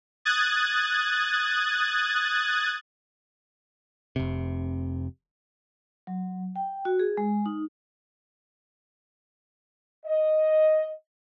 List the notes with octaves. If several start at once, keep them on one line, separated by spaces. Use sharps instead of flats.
D#6 F#6 G#6 A6
F1 C3
F#3
G5
F#4
G#4
G#3
D#4
D#5